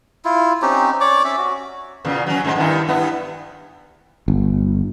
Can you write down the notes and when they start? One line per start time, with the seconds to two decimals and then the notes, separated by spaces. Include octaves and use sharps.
0.25 E4 F4
0.62 C4 C#4 D#4 G4
1.01 C#5 D5 D6
1.25 C#4 E5
1.38 F#4
2.05 E2 A#2 C#3
2.26 F#3 C#4
2.44 G#2 C3 G#3
2.56 G2 D#3 E4
2.88 G2 B3 E4
4.28 G1